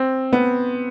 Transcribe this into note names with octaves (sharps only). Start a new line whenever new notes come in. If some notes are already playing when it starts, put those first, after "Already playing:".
Already playing: C4
B3